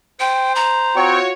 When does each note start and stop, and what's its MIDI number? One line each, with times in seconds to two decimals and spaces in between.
0.20 0.96 72
0.20 0.53 79
0.56 1.09 82
0.96 1.19 60
0.96 1.32 65
0.96 1.32 66
0.96 1.32 73
0.96 1.19 79
0.96 1.19 85